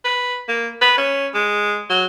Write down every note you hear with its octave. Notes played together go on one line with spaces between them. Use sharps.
B4
A#3
B4
C#4
G#3
F#3